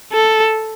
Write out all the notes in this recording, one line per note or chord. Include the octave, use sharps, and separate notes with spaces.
A4